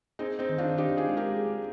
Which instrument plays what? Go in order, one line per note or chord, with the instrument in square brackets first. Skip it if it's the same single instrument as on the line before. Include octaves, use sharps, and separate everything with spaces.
[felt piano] C4 D#4 [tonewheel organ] G#4
[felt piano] C4 D#4
[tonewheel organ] D#3
[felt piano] D4 F4
[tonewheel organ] D4 [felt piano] D#4 G4
[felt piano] F4 G#4
[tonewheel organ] G#3
[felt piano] G4 A#4
[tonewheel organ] G#4